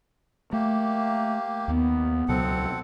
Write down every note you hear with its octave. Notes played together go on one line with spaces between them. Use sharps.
A3 A#3 G4
D#2 B3
C#2 B2 F#3 C4 A4 F#5